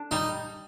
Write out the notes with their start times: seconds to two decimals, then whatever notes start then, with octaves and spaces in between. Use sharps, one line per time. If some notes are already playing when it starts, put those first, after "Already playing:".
Already playing: D4
0.11 G3 D#4